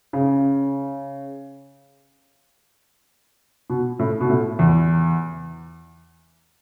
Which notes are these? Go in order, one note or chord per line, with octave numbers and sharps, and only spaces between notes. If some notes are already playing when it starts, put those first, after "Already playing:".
C#3
B2
A2
B2
A2
E2